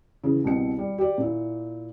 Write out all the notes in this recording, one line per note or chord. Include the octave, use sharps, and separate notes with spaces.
C#3 E3
C2 B2 C4 C#7
G3
G4 D5
A#2 E4